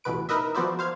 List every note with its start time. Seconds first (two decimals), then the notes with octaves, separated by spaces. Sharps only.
0.04 A1 E2 B2 B4 D7
0.29 D#4 A#4 B4 D#5 E5
0.55 F3 B3 F#4 C5 D5 E5
0.79 C5 F5 F6 G#6